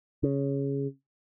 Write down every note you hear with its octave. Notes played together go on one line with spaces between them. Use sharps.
C#3